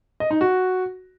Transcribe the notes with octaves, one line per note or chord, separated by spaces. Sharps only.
D#5
D#4
F#4